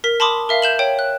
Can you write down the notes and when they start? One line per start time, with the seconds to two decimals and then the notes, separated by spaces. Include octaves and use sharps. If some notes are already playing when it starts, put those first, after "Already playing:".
0.04 A#4 B6
0.20 A5 B5 C6 D6 D#6
0.49 A#4 E5 F5
0.62 G6 E7 F#7
0.79 C#5 G5
0.99 F#6